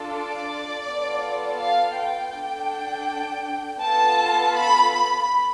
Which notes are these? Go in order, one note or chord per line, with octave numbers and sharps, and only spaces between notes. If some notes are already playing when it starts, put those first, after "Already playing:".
Already playing: D4 F4 A4
D5
B3 F4 A4
F5
G5
D4 A4
B3 F4 A4 A5
B5
B5